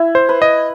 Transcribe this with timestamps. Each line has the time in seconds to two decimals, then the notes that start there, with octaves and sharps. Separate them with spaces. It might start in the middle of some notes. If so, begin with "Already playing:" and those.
Already playing: E4
0.15 C5
0.29 B4
0.42 D#5